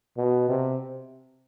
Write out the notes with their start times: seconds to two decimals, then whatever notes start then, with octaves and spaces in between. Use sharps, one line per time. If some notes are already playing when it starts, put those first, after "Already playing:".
0.17 B2
0.49 C3